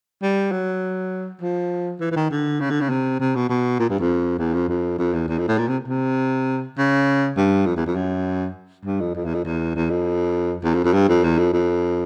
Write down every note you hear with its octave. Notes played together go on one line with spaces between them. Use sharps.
G3
F#3
F3
E3
E3
D#3
D3
C#3
D3
C#3
C3
C3
B2
B2
A#2
G2
F2
E2
F2
F2
F2
E2
E2
F2
A2
A#2
C3
C3
C#3
G2
F2
E2
F2
F#2
G2
F2
F2
E2
F2
E2
E2
F2
E2
F2
F2
G2
F2
E2
F2
F2